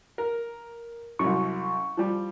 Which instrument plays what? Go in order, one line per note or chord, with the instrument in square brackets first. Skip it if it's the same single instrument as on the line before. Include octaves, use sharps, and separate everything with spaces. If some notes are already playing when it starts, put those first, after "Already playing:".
[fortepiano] A#4
[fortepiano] C2 F#2 [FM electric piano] C#6
[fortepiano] F3 G3